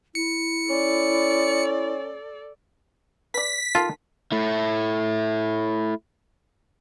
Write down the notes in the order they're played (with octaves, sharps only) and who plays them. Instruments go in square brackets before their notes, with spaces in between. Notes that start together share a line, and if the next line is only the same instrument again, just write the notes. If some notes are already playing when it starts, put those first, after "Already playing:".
[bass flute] E4 [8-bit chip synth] C#7
[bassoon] C#4 [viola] A4 D5
[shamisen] B4 D5 [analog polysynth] B6
[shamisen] D#3 A4 [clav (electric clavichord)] F4
[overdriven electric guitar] A3 E4